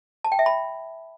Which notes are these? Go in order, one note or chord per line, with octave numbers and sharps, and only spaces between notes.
A5
G5
E5
B5